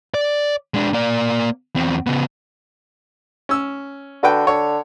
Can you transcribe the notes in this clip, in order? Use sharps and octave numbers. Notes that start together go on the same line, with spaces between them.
D5
G#3 D4
A#3 D5
E2 C4
C#3 B3
C#4 E6
D3 F#4 B4 G5
D3 C#5